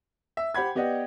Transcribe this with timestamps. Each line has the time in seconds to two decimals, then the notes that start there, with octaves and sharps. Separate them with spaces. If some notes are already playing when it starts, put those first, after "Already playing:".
0.37 E5
0.54 G4 C5 F#5 B5 G#6
0.75 B3 G4 D5 D#5 F#5 G5